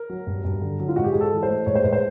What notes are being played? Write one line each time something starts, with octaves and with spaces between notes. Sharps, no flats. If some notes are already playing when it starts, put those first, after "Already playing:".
Already playing: A#4
F#3
G2
G2
D3
F#3
F4
G#2 F#4
G4
G#2 G#4
A4
E3
C5
A3
G#2 C#5
C5
G#2 B4
C5